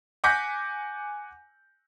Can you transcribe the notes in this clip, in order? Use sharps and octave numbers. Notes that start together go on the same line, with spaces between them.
F#5 G#5 D6 G6 A#6 B6